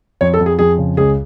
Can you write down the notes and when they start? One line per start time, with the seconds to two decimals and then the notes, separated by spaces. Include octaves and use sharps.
0.21 F2 C#5
0.34 A4
0.40 F2
0.46 G#4
0.59 F2 G#4
0.78 C#3
0.97 C#2 G#4